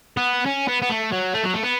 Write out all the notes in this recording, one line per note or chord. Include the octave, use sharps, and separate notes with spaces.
B3
C#4
B3
B3
A3
F#3
A3
F#3
A3
B3